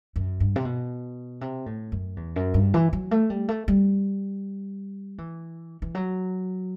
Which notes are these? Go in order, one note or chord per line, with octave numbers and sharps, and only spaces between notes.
F#2
G2
C3
B2
C3
A2
F#2
E2
F#2
G2
E3
F#3
A3
G3
A3
G3
E3
E3
F#3